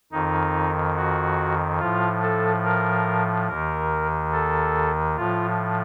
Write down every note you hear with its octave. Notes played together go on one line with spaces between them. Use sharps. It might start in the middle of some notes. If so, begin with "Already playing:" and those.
F2 D#3 D#4
F#4
A2 F3 F4
A4
A#4
D#2 D#3 A#4
A4
A2 F3 F4